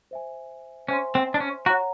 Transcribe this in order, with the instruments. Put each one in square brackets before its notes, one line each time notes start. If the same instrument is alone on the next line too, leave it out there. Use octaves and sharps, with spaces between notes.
[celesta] C5 E5 G#5
[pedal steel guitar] C#4 [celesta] C5 E5 G#5 C6
[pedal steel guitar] C4
D4
C#4
[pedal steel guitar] F#4 [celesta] C#5 F#5 A#5